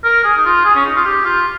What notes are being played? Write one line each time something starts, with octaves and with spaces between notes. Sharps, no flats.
A#4
G#4
D#4
F4
G#4
C#4
D#4
F4
G4
F4